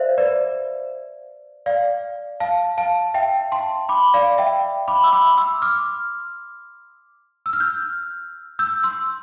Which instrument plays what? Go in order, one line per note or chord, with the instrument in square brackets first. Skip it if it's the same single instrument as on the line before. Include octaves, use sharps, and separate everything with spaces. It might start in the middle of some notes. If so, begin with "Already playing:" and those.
Already playing: [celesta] C5 D5 E5 F5
B4 D5
D5 F5
F5 A5
F5 A5
E5 G5
A5 C6
B5 D6
D5 F5
E5 G5
B5 D6
E6
B5 D6
C6 E6
D6 F6
E6
F6
E6 G6
E6 G6
C6 E6